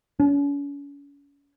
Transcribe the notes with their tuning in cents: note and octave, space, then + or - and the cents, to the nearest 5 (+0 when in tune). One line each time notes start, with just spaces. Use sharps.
C#4 +40